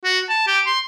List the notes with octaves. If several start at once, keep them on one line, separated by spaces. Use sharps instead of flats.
F#4
A5
G4
C6